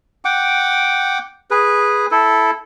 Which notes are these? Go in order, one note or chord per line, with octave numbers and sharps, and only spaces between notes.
F#5 G5 D6
G#4 B4
E4 A4